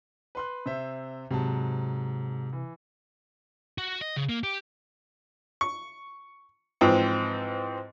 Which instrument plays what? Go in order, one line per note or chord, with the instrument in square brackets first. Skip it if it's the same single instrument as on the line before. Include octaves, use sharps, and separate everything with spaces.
[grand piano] B4 C6 F#6
C3 C5 E5
[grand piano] G#2 F#3 A5 [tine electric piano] C3
[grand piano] E3
[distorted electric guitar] F#4
D#5
C#3
A#3
G4
[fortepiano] C#6
G#2 E3 F3 C4